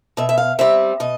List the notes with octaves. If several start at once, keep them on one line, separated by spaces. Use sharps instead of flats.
B2 E5
E5
F5
G3 C4 E5
B2 D#5